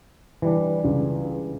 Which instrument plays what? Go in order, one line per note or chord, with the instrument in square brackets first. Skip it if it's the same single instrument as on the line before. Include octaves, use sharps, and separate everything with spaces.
[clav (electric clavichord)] E3 G3 D4
[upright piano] C#2